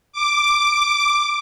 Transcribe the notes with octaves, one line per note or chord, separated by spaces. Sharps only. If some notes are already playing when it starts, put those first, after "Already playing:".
D6